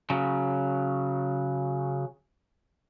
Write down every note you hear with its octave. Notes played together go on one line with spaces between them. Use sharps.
C#3 F#3